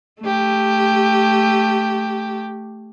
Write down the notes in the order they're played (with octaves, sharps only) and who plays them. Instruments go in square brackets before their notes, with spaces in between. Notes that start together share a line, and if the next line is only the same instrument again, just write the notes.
[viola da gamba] A3 G4